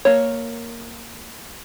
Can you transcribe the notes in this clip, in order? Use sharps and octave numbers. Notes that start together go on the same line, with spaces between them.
A#3 C#5